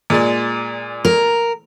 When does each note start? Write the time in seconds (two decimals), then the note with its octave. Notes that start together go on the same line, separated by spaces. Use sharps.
0.10 A#2 G#3 D5
1.05 A#4